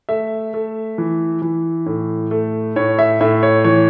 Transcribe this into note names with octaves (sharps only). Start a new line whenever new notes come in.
A3 E5
A3
E3
E3
A2
A3
A2 C#5
E5
A2 E5
C#5
E3 C#5